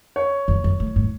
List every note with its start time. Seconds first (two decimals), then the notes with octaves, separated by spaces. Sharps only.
0.16 C#5
0.48 F2
0.64 F#2
0.80 A2
0.96 A2